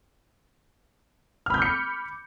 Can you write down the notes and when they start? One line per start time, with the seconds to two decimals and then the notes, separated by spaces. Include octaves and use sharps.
1.46 F6
1.50 B5
1.54 G6
1.58 D6
1.62 C#7